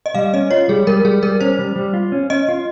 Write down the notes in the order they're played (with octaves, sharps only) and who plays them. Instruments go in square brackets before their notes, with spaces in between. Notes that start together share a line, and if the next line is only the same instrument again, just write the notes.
[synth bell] D#5
[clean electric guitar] G3 [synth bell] F5
[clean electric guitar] C#4 [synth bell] D#5
[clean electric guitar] F4 [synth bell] C#5
[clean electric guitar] G3 [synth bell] G#4
[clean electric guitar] G3 [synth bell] A#4
[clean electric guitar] G3 [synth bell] G#4
[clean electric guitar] G3 [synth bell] A#4
[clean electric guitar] C#4 [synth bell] C5
[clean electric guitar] G3
G3
F4
C#4
[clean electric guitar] C#4 [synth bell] D#5
[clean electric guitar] F4